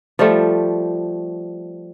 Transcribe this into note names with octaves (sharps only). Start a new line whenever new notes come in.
F3 G3 A3